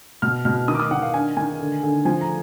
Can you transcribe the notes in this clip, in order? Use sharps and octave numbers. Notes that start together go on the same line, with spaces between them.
B2 F6
B2 F6
D#3 D#6
D6
D#6
D#3 F#5
F5
D4 G#5
D#3 G#5
D3
D3
F3 G#5
A#5